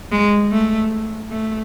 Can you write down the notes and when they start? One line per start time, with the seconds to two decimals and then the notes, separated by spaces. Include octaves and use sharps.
0.12 G#3
0.52 A3
1.31 A3